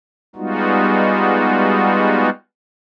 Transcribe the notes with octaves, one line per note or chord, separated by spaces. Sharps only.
G3 G#3 B3 D#4 F4 F#4